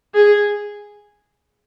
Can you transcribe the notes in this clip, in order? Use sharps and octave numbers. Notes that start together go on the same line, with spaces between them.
G#4